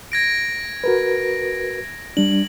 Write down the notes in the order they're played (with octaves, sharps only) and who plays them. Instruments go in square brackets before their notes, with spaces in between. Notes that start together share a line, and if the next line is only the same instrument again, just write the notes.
[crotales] G#6 A#6 D7
[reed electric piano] F#4 A#4 B4
[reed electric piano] G3 D4 [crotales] F#7